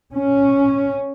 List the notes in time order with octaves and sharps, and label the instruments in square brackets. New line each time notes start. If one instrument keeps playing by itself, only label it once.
[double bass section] C#4